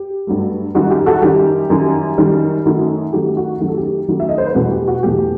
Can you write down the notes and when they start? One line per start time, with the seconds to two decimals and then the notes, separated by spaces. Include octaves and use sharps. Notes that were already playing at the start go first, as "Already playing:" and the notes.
Already playing: G4
0.27 G2 F#3 A3
0.75 F#2 D#3 G3 F#4
0.91 G4
1.06 F#4 A4
1.22 F#2 D#3 G3 G4
1.70 F#2 D#3 G3
2.18 F#2 D#3 G3
2.65 F#2 D#3 F#3 A3
3.13 F#2 D#3 F#3 A3 G4
3.37 F#4
3.60 F#2 D#3 F#3 A3 G4
3.69 A4
3.77 G4
4.08 F#2 D#3 F#3 A3
4.20 E5
4.29 D#5
4.38 C5
4.47 B4
4.55 E2 B2 F#3 A3 F#4 A4
4.72 G4
4.88 F#4
5.03 E2 B2 F#3 A3 G4